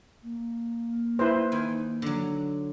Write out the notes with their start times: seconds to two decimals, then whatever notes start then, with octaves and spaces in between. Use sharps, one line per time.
0.23 A#3
1.19 E4 B4 C5
1.52 D#3 G#5
2.02 D3 F#3